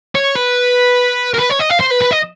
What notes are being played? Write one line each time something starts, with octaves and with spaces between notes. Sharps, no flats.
C#5
B4
A#4
B4
C#5
D#5
F5
C5
B4
B4
D#5